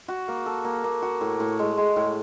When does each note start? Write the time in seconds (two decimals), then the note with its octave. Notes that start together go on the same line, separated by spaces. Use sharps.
0.08 F#4
0.28 A#3
0.46 A4
0.64 A#3
0.84 A#3
1.02 F#4
1.21 A2
1.40 A2
1.59 G#3
1.77 G#3
1.96 A2